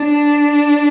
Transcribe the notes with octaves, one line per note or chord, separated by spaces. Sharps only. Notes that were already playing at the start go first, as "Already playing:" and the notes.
Already playing: D4